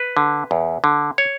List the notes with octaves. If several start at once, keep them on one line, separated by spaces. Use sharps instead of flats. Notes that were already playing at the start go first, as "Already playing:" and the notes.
Already playing: B4
D3
E2
D3
C#5